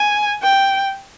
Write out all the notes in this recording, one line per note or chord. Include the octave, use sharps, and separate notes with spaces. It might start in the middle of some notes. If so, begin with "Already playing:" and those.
Already playing: G#5
G5